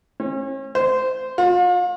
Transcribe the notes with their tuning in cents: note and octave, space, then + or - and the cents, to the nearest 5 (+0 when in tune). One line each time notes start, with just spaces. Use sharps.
C#4 -40
C5 -20
F4 +40